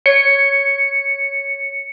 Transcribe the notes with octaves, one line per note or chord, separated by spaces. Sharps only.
C#5 C#7